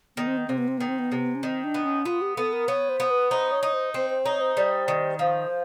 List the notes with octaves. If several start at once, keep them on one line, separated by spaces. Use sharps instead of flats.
D#3 B3
C4
B3
C3 C4
B3
C4
D#3 B3
C4
B3
C3
C#4
D#3 C4
D4
B3
C#4
B3 F4
G4
B3 A4
A#4
B3 C#5
C5
B3
B4
D#4 C5
C#5
D#4
C5
C4 C5
C5
D#4 C#5
C5
G3
D#3
F3 C5